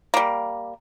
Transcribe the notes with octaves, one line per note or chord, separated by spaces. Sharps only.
G3 A#3